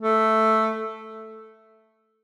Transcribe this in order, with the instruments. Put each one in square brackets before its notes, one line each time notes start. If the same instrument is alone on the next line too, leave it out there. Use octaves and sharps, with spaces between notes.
[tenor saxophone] A3